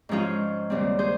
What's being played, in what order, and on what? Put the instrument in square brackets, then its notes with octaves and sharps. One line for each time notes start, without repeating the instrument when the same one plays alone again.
[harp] G#2 F3 G#3 C#4 F4 G#4
D#2 C#3 G3 C4
G#4 C5